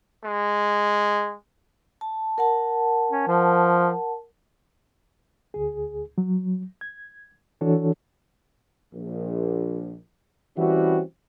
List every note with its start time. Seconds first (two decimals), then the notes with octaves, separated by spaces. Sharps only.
0.24 G#3
2.01 A5
2.38 A#4 F#5 A5
3.11 C#4
3.27 F3
5.54 D2 G#4
6.18 F#3
6.81 G#6
7.61 E3 D4 F#4 A4 C#5
8.95 A#1
10.57 E3 G3 C4 C#4 E4 F#4